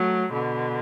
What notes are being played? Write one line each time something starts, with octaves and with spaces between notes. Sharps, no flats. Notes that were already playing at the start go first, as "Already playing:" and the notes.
Already playing: F#3 A3
B2 D3